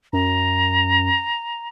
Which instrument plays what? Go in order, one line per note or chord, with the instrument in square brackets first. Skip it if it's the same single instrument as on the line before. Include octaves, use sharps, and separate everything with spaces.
[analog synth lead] F#2 [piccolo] A#5